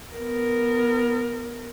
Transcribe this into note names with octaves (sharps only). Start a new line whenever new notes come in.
B3 A#4